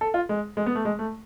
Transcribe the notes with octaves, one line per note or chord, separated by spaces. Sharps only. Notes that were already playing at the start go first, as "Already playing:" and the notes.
A4
F4
G#3
G#3
B3
A3
G#3
A3